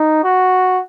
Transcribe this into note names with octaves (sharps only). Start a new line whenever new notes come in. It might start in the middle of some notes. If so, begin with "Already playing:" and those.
Already playing: D#4
F#4